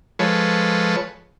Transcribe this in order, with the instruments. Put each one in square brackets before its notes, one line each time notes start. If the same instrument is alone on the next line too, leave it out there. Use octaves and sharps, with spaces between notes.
[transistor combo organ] F3 G#3 A4 B4 C#5